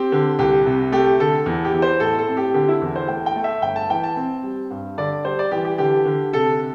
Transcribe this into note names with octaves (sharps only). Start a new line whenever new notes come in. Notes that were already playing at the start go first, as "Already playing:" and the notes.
Already playing: C4 G4
D3
C2 G4
C3
A3 G4
D3 A4
E2
G4
E2
C5
A2 A4
A4
C4
G4
D3 G4
E4
E2
C5
A3 G5
G5
A3
E5
G1 G5
A5
E3 G5
A5
C4
G3
G2
D3 D5
G3 C5
D5
E3 G4
G4
D3 G4
D3
C3 A4